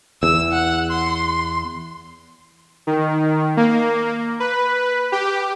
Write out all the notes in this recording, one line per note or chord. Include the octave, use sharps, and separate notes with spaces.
E2 E6
F#5
C6
D#3
A#3
B4
G4